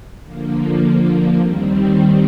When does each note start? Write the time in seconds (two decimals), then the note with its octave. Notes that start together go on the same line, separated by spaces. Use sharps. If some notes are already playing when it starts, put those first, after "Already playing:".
0.24 D3 F3 A#3
1.38 D#2 D#3 G3 C4